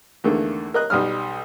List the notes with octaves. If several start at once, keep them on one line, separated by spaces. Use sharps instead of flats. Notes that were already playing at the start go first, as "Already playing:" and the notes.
E2 D3 D#3 A3 A#3
A#4 D#5 F#6
B1 G3 D#6 F6